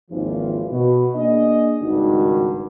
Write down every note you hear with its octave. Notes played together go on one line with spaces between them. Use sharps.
G#1 D#2 E3 F3
B2
A#3 D4 G#4 D#5
G#1 C#2 G2 D#3 D#4 F#4